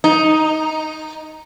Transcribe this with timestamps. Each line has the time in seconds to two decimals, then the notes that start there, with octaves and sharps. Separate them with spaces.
0.04 D#4